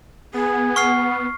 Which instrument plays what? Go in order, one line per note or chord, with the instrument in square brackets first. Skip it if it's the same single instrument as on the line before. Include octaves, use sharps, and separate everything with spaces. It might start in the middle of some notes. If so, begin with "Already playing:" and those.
[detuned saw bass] B3 [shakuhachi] G#4
[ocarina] F#5 [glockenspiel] C#6 F6 C7